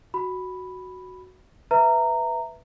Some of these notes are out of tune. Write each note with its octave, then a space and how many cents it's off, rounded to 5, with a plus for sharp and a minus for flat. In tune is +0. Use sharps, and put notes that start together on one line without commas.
F#4 +0 B5 +0
B4 +0 E5 +0 A#5 -15